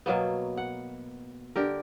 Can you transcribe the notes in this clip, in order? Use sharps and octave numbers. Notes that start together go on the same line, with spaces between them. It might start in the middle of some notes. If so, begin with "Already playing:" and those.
B2 F#3 A#3 B3
F#5
D3 G4 A#4